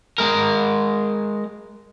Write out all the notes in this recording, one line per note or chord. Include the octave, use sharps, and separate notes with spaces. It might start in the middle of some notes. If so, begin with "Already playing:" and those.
G#3 A#4